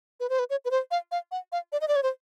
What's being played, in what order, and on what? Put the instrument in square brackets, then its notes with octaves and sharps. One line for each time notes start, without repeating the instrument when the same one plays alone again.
[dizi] B4
C5
B4
C#5
B4
C5
F5
F5
F#5
F5
D5
D#5
D5
C#5
C5